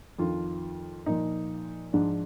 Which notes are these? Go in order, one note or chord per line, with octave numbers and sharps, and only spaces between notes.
F2 D#3 F4
A#2 F3 D#4
G#2 F3 D4